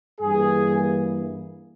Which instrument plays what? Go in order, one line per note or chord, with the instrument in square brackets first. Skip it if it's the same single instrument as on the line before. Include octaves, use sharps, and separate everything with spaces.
[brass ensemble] G2 E3 A#3 G#4